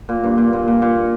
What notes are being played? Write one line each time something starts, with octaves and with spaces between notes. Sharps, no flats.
A#2
G2
A#2
A#2
A#2
A#2